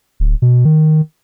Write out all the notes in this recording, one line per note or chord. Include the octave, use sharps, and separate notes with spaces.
D1
B2
D#3